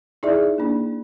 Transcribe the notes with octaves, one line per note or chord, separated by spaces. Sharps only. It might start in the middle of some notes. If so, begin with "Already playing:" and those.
D#4 E4 G#4 D5 E5
A#3 D4